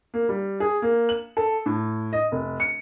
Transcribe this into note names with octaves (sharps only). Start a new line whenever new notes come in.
A#3
G3
G#4
A#3
F#7
A4
A2
D#5
F1
C#7